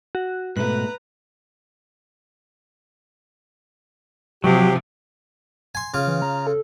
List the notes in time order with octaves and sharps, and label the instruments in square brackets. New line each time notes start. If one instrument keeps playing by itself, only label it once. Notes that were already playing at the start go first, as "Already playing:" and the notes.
[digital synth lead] F#4
[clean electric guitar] G#2 B2 A3 [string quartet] B4 A#5 [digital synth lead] F#6
[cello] C3 F3 [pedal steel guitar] F#3 [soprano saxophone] G4
[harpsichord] G#5 C6
C#3 F4
[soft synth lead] E3
A#5
A4